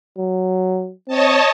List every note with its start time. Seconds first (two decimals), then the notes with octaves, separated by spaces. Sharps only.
0.18 F#3
1.08 C4 C#5 D#5 A5